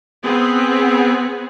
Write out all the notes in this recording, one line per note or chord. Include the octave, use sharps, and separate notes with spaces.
B3 C4 G#4